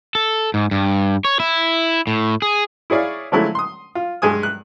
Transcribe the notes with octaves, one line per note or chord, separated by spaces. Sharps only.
A4
G#2
G2
C#5
E4
A2
G#4
E4 G#4 C#5 D5 F5
D3 F3 F#3 G#3 A3 E4
C6 D#6
F4
G2 G#3 G#5 D#6
F#6